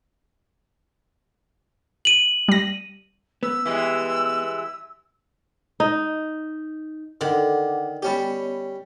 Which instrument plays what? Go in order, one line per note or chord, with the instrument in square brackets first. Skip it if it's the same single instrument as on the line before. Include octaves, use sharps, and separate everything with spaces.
[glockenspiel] D#7 F#7
[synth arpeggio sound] G3 A#6
[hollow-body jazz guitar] B3 [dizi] E6
[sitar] E3 G3 G#3
[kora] D#4
[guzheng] D3 [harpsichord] D#3 [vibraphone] D4 F#5 D6
[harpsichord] G3 C#4 G4 [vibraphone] B3 C#5 D#5